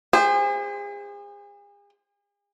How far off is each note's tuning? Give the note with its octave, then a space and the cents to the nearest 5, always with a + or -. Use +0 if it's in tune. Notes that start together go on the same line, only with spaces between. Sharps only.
G#4 -40 C5 +0